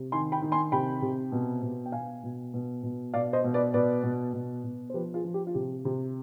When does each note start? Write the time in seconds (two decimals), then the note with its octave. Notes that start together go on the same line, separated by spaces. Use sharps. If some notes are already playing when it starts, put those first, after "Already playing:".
Already playing: C3
0.12 D#3 G#5 C6
0.32 G5 B5
0.42 D#3
0.52 G#5 C6
0.72 C3 G5 B5
1.02 C3
1.32 B2
1.62 B2
1.86 G5
1.92 B2 F5 G#5
2.23 B2
2.54 B2
2.83 B2
3.14 B2 D5 F5
3.33 C5 D#5
3.44 B2
3.54 B4 D5
3.74 B2 B4 D5
4.03 B2
4.33 B2
4.64 B2
4.90 C5
4.94 F3 G4 B4
5.14 F4 G#4
5.24 F3
5.34 G4
5.47 F4
5.54 C3 G4
5.85 C3